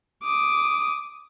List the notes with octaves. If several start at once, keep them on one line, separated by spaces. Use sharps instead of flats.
D6 D#6